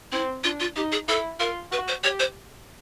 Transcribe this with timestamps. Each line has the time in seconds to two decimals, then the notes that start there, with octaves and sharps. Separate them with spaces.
0.12 C4 E4
0.44 D4 F4
0.60 F4
0.76 D#4 G4
0.92 G#4
1.08 E4 A4
1.40 F4 A#4
1.71 F#4 B4
1.88 C5
2.04 G4 C#5
2.20 C5